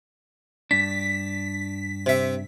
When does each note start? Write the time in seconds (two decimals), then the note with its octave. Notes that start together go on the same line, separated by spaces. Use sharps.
0.71 G2 D4 B6
2.06 C3 E5